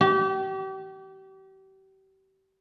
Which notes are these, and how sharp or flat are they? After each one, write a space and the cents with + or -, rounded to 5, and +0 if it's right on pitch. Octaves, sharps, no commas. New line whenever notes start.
G4 -35